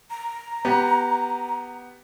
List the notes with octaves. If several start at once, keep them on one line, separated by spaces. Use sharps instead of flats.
A#5
B3 G4